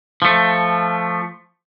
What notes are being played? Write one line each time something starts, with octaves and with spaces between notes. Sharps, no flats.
F3 A3